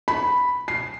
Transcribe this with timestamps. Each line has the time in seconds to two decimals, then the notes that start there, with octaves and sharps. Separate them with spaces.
0.08 B5
0.68 C7